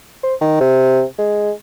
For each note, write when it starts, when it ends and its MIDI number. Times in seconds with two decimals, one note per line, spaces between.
0.24 0.35 72
0.41 0.56 51
0.61 1.03 48
1.19 1.52 56